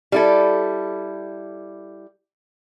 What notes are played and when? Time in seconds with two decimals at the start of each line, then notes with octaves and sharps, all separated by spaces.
0.12 G3 E4 A4